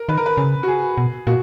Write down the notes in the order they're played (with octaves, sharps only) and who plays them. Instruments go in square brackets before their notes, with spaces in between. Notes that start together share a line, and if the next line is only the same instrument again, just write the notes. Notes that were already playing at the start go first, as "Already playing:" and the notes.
Already playing: [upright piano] A#4
[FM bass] D#3 [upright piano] B4
[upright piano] A#4
B4
[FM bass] C#3
[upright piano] F#4
G#4
[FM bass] B2
[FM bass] A#2 [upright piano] F#4